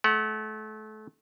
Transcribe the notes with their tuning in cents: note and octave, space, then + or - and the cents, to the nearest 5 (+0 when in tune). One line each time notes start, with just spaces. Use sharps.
A3 -30 F#5 +15